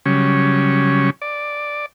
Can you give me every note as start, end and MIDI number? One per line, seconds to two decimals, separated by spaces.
0.06 1.10 49
0.06 1.10 54
0.06 1.10 55
0.06 1.10 61
1.22 1.86 74